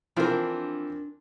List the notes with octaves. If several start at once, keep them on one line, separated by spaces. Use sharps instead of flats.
E3 F3 C4 D4 A#4